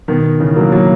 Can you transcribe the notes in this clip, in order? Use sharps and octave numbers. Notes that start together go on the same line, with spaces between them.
B2 D#3
C#3 E3
F#3 A#3
F#3 A#3